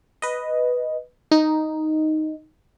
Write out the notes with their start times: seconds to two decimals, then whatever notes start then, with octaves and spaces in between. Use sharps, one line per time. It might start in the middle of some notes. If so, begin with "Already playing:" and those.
0.22 B4 D#5
1.31 D#4